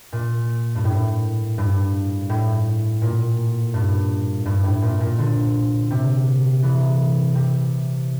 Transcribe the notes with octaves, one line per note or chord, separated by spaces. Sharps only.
A#2
G2
A2
G2
A2
A#2
G2
G2
A2
A#2
A#2
D3
C3
E3
C3